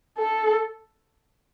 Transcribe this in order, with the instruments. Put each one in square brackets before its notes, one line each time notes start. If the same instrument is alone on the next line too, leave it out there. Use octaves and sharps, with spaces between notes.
[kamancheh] A4